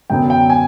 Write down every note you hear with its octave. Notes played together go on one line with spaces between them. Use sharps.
F#2 D3 F#3 B3 G5
G5
G#5